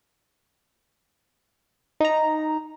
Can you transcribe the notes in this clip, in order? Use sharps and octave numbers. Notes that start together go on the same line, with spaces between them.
D#4 A#5